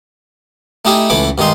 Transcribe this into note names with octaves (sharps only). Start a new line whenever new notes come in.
A3 D#4 E4 G4 G#4 E5
C#2 E3 A3 B5 D6
G2 D#3 G#3 D#4 C6